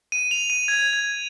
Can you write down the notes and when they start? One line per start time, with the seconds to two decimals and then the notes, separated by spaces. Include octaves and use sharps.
0.12 D#7
0.31 F7
0.50 D#7
0.68 G#6
0.93 G#6